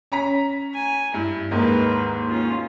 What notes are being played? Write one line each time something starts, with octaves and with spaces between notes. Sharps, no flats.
C#4 A#5 B6
G#5
G2 E4
D#2 G#2 A#4 B4
C#4 F4